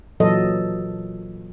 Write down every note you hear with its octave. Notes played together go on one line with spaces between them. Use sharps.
A#2 E3 F#3 A4 D#5